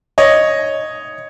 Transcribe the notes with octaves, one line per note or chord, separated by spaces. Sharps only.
C#5 D#5